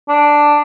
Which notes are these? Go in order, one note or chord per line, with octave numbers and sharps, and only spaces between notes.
D4